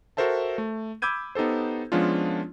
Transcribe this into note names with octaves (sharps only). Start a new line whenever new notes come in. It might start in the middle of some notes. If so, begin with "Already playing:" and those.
F#4 A4 A#4 C5 E5 A5
A3
B5 D6 E6 G6 G#6 D#7
B3 D#4 G4 A4 C5
F3 G#3 B3 C#4 D4 F4